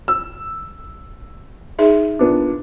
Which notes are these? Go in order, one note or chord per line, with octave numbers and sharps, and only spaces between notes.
E6
D#4 G#4 E5
A#2 B3 D4